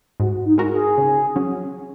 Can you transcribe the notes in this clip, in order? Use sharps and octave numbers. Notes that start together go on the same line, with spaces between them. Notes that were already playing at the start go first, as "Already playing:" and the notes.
G#2 F#4
D#4
G#3 F#4 A#4
G#4
C#3
F#3 C#4